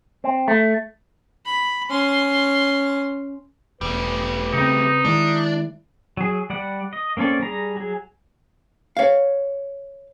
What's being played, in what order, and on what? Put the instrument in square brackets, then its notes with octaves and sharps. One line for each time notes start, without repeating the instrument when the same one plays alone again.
[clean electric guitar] C4
A3
[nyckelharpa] B5
C#4 C6
[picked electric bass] E1 [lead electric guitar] G3 A3 [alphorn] B4
[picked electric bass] C#3 C4 [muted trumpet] D#4
[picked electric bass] D#3 G#3 [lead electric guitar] D4 [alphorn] E4
[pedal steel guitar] F#3 G#4
G3 D5 F#5
D#5
A#3 C4 C#4 A4 D5
G3 G#4 A#5
F#3 G#4
[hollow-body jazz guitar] C#5 F5